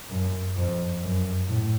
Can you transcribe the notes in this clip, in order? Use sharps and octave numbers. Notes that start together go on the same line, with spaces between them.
F#2
F2
F#2
A2